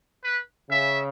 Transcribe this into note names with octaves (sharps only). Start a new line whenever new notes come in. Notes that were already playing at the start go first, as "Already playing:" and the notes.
B4
C#3 E5